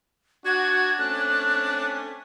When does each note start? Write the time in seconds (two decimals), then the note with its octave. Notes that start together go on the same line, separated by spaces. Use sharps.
0.45 D4 F#4 G#6
0.99 A3 C4 C#4 F#6